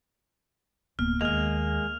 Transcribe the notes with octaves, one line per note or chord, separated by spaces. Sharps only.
D1 A#3 B3 F6
D#2 G#3 A#3 D#5 F6 F7